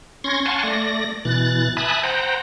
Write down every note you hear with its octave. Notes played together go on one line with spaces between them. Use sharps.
C#4 C6 C#6 G#6 A#6
F5 F#5 G#5 A5 C6 C#6
A3 D5 A#6
B2 E3 F#6 A6
E5 G#5 A5 B5 D#6 F#6
C5 F#5 G5 A#5